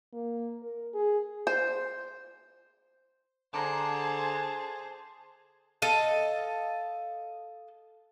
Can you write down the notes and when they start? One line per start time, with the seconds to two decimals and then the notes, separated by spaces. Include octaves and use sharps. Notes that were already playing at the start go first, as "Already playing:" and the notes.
0.13 A#3
0.63 A#4
0.94 G#4
1.47 C5
3.54 D3 G#4 C5 A5 A#5 D6
5.82 A4 D#5 F5